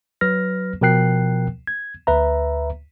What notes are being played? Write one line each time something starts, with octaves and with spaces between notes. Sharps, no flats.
F#3 B4 F6 A#6
B2 F3 A#4 G5 F#6 C7
G#6
D2 B4 E5 A#5